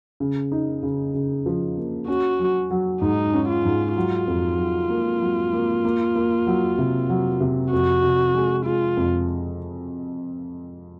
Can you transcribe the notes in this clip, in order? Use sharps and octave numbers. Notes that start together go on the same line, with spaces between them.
C#3
D#4
C#3
C#3
F3
A#3
C#4 F#4
F#3
F#3
G#2 D#4
C#4
F4
G#2
F#3 F4
F2
F#3
A#3
F#3
A#3
A#3
A#3
F#3
C3
F#3
C3
F2 F#4
C3
G#3
G#3 F4
F2